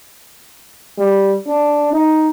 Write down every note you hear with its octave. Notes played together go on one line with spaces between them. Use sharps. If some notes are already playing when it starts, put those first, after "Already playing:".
G3
D4
D#4